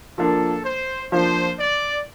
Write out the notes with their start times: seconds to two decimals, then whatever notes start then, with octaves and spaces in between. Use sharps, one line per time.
0.18 F3 A#3 D4 F4 A4
0.64 C5
1.11 F3 A#3 D4 F4 C5
1.59 D5